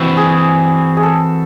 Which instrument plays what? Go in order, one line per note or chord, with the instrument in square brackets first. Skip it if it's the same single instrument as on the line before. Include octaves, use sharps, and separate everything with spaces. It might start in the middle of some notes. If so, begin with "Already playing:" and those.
Already playing: [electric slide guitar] E3 C4 E4 [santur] F#4
[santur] G#4
G#4
A4